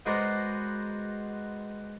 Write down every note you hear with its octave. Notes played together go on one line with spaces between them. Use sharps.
G#3 B3 F#4 A#4 C5 D5